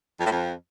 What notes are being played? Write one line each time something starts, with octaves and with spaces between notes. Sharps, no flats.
F2
A2
F2